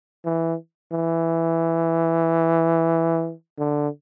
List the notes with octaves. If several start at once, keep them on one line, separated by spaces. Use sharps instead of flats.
E3
E3
D3